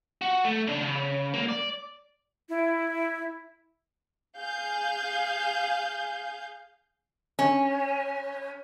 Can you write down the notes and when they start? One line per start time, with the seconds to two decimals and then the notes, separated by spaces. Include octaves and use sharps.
0.21 F#4
0.45 A3
0.67 C#3 D4
0.82 C#3
1.34 C#2 A#3
1.48 D5
2.49 E4
4.37 G#4 F5 G6
7.39 C#4